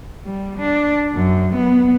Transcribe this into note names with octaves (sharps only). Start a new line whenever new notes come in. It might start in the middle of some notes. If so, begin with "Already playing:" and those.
G3
D4
F#2
B3